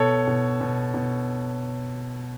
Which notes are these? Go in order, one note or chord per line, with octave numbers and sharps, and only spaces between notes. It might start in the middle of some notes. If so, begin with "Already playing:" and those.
Already playing: B2 A4 C#5
B2
B2
B2